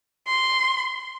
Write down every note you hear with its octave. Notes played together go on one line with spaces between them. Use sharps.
C6